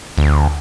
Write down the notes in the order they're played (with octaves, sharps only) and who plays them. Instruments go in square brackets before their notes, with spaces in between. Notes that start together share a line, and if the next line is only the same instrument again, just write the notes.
[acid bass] D2